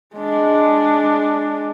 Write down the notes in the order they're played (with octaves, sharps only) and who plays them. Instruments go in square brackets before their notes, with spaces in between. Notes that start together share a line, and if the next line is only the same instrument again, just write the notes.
[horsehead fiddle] G#3 D4